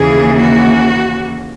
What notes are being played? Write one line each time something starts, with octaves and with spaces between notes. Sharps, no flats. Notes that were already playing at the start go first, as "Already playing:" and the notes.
Already playing: D#2 C#3 E3 A#3 G#4
F#4